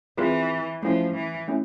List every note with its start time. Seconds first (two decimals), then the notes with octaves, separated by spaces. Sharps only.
0.17 E3 C4 F4 G#4 B4
0.82 F3 A3 C#4 E4
1.14 E3
1.48 A3 C#4 E4